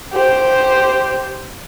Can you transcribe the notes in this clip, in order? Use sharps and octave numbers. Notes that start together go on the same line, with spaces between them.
G4 C5